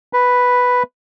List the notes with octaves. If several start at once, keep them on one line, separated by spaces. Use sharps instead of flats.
B4